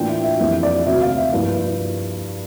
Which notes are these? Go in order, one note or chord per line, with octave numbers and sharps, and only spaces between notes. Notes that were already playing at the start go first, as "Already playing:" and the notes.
Already playing: A2 E3 A#3 D4 F4 G5
E5
E5
F2 E3 G3 A#3 E4 E5
D5
D2 C3 G3 E5
F5
E5
G2 F3 A#3 E4